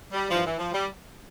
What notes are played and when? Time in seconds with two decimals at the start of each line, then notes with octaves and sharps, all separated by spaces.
0.12 G3
0.30 G2 E3 F3
0.44 E3
0.59 F3
0.73 G3